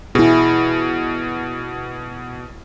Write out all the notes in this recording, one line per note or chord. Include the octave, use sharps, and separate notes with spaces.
B2 E4 G#4